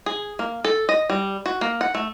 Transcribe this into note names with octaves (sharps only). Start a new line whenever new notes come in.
G#4
A#3
A4
D#5
G3
F#4
A#3
F#5
A3